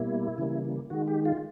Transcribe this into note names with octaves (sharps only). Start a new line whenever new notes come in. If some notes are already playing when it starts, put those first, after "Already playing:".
Already playing: B2 G3 A#3 E4
C#3 E3 G3 A#3
D#3 G#3 F#4
G4
F4